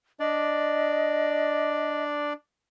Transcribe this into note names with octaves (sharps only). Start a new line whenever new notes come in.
D4 D5 D#5